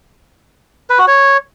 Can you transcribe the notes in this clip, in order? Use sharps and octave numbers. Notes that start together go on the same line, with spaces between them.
B4
F#4
C#5